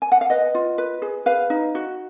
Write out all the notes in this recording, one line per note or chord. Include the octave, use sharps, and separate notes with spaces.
G#5
F#5
F5
B4 D#5
F4
B4
G#4
B4 F5
D#4
F#4